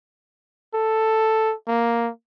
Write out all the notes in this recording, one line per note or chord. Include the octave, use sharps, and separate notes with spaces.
A4
A#3